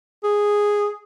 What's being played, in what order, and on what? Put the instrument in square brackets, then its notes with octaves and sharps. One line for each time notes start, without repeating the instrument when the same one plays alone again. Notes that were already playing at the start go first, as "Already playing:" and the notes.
[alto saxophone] G#4